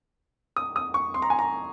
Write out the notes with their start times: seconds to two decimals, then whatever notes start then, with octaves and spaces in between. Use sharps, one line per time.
0.56 D#6
0.76 D#6
0.94 C#6
1.14 C6
1.22 A#5
1.30 G#5
1.39 A#5